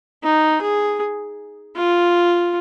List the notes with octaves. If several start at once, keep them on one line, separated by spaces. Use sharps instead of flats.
D#4
G#4
F4